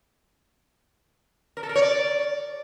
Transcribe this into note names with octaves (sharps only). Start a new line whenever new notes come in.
A#4
A4
A#4
C#5
D5